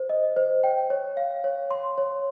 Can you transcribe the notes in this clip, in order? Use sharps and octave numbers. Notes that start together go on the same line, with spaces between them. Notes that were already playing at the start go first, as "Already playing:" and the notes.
Already playing: C5
D#5
C5
G5
C#5
F5
C#5
C6
C#5